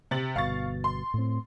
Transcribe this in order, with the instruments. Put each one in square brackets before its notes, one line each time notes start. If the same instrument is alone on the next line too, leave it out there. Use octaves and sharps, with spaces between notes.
[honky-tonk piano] C3 A6 F#7
[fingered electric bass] G1 B2 [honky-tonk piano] F5 C#6 A6
[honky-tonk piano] C6
[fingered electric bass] A2 C4